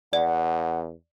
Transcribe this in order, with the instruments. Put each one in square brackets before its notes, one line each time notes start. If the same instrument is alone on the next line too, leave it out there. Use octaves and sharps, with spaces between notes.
[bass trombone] E2 [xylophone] D5 [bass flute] F#5